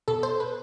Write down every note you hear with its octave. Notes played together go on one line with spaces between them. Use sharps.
B2 A4
C5
B4